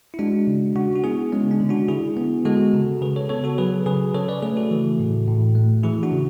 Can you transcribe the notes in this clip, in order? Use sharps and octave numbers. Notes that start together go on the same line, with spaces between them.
E4
G#3 D4 F#4
C#3
C#3 D4 F#4
F#4
B3 E4 G#4
G#3 C#4
D4
D3
D4 F#4
D3 E4 G#4
B3
G#3 F#4 A4
C#3
C#3 G#4 B4
A4 C#5
B3 A4 C#5
F#4 A4
F#3 G#4 B4
C#3 G#4 B4
C#3 A4 C#5
B4 D5
A3 G#4 B4
F#4 A4
E3
A2
A2
A3
E3 E4 G#4
D4 F#4
C#3